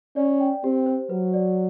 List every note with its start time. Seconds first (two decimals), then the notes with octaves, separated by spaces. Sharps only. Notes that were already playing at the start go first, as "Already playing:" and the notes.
0.16 C#4 D5
0.40 G5
0.64 C4 G4
0.86 C5
1.10 F#3 B4
1.34 D5